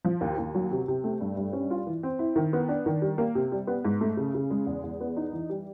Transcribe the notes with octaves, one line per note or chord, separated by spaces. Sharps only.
F3
D#2
D#2
F#3
C3
C3
A3
G2
G2
C#4
F4
E3
C4
E4
D#3
B3
D4
D#3
G3
A#3
C3
G3
B3
G#2
A3
C#3
C#3
G#3
E2
E2
B3
D#4
E3
G3